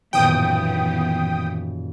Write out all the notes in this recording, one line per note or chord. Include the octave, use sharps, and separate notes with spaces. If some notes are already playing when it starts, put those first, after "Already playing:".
D#1 F#2 A2 E3 B3 G5 D#6